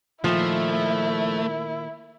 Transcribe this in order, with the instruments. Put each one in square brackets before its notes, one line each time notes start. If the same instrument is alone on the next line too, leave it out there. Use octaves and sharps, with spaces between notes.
[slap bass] A#2 D#3 [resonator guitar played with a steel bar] F3 [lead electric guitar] A3 [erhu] E4